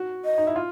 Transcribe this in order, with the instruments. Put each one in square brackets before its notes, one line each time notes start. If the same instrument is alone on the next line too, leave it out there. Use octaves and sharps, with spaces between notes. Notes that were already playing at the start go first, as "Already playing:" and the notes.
Already playing: [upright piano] F#4
[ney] D#5
[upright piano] D#4
E4
F4